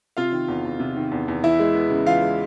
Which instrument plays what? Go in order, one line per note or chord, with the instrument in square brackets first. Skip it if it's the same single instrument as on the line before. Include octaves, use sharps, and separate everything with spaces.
[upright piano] C3 [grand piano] F4 F5
[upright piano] D#3
E2
E2
C3
D#3
E2
E2
[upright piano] E3 [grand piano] E4 E5
[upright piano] G#3
B3
C#3
[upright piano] E3 [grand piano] F4 F5
[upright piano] G#3